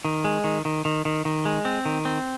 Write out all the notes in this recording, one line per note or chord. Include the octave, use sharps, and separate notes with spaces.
D#3
G#3
D#3
D#3
D#3
D#3
D#3
G#3
C4
D#3
C4